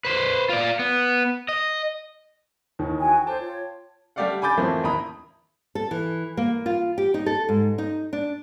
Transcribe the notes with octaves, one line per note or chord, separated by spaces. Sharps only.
B4 C5
F4 D5
B3
D#5
D#2 D#3 E3
F#4 G5 G#5
A4 C5 C#5 G5 A5 D6
F4 C#5
G3 A3 G4 D5 F5 F#5
G#5 B5 D6 G6 A6
F2 A2 E3 F3 A#3 C4
D#2 E4 A#5 B5 D#6
A4
E3
A#3
F4
G4
D#4
A4
G#2
D#4
D4